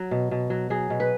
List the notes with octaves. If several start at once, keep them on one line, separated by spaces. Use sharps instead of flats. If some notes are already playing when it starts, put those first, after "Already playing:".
Already playing: F#3
B2
B2
F#3
F#3 G#4
B2
B4